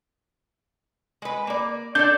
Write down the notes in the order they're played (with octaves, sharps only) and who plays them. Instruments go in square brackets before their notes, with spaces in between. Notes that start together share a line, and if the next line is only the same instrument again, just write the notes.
[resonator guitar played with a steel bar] G#3 B4
A#3 D5
[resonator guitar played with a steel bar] D4 A4 D5 [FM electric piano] G6